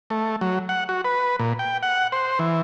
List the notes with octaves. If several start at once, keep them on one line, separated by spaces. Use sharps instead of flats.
A3
F#3
F#5
F#4
B4
A#2
G5
F#5
C5
E3